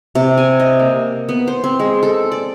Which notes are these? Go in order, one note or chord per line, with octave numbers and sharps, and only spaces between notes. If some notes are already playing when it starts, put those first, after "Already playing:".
C3
G#5
D#5
A#3
B3
C5
C4
G#3
A4
D5